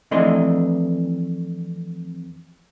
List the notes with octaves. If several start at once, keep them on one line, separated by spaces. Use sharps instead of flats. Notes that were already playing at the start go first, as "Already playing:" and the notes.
F2 E3 A3 D4 D#5 C6